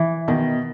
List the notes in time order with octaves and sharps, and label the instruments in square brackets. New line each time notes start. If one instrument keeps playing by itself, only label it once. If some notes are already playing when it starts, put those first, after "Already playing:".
Already playing: [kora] E3
[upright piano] B2 [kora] D#3